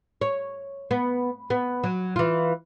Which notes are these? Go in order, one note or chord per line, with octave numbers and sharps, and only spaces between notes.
C#5
B3
B3
F#3
E3 F4